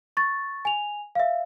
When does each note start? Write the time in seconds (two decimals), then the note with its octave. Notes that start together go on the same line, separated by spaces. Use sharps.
0.17 C#6 A6
0.65 G#5 F7
1.15 E5 F5